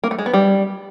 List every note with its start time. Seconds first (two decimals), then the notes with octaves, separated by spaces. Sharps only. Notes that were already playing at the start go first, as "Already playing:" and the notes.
0.04 A#3
0.11 A3
0.19 G#3
0.26 B3
0.34 G3